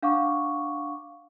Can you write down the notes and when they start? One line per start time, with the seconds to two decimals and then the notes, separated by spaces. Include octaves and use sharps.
0.03 D4 F5 F#5 C#6 D6